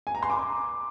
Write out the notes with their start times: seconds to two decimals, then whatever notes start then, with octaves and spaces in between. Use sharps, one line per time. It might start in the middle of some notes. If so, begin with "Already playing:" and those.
0.07 G#5
0.15 A#5
0.23 C6
0.30 D6